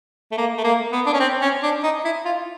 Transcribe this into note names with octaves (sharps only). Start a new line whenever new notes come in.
A3
A#3
A3
A#3
B3
D4
C#4
C4
C#4
D4
D#4
E4
F4